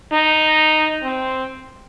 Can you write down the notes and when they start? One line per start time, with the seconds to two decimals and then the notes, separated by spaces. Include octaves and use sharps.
0.13 D#4
1.03 C4